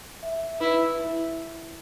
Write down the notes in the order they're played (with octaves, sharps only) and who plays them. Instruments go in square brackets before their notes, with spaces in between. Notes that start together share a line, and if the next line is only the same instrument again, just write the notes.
[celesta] E5
[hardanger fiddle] E4 [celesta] B4
[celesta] E4